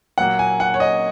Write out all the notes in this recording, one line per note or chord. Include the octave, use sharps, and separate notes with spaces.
A#2 F#3 A#3 F#5
G#5
F#5
C#5
D#5